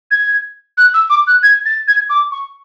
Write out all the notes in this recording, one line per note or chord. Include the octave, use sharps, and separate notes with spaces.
G#6
F#6
E6
D6
F#6
G#6
A6
G#6
D6
C#6